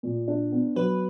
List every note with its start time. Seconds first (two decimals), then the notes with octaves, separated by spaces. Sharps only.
0.03 A#2
0.28 D4
0.52 B3
0.76 F#3 B4